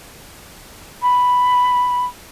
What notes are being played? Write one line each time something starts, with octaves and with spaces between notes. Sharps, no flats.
B5